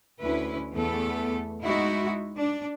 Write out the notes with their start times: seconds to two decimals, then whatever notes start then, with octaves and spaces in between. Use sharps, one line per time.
0.22 D2 C#4 E4 B4
0.74 E2 A3 B3 A4
1.62 G#3 D#4 E4 F#4
2.36 D4